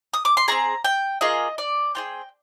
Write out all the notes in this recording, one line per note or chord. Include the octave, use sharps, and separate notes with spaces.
D#6
D6
C6
C4 F4 G#4 A#5
G5
A#3 F4 G#4 D#5
D5
C4 F4 G#4 G5